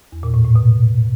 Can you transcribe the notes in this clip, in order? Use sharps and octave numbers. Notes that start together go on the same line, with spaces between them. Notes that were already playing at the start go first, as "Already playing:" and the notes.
E2
A#2
A2
A2
B2